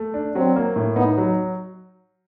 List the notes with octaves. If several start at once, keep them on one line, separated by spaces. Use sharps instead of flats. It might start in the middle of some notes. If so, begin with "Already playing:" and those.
Already playing: A3
D4
F#3 C4
A#3
A2
B3 D#4
F#3